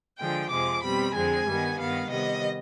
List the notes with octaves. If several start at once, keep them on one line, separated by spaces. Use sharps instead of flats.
D3 F3 G#3 G5
F2 C3 F3 G#3 D6
B2 G3 C4 B5
F2 D3 G#3 C4 G#5
G2 D#3 G3 B3
G2 D#3 B3 F5
C3 D#3 G3 B3 D#5